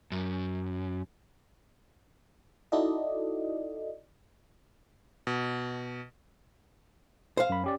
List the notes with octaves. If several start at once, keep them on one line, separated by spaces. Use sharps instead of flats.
F#2
D#4 E4 F#4 A4 D5 D#5
B2
C5 F5
F#2 B5
C#4 G4 D5